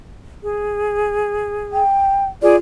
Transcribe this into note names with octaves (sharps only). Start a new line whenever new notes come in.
G#4
G5
F4 G#4 D5